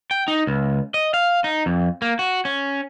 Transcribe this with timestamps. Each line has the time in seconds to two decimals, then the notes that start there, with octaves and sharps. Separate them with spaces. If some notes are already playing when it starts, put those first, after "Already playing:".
0.11 G5
0.28 D#4
0.47 C#2
0.94 D#5
1.14 F5
1.44 D#4
1.66 F2
2.02 A#3
2.19 F#4
2.45 C#4